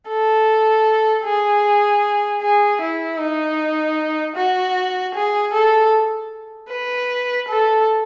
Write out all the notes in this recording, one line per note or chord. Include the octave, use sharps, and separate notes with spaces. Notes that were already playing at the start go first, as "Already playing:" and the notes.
A4
G#4
G#4
E4
D#4
F#4
G#4
A4
B4
A4